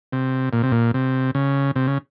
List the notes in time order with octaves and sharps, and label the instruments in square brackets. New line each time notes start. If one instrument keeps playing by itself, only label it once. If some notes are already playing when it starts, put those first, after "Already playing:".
[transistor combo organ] C3
A#2
C3
A#2
C3
C#3
C3
C#3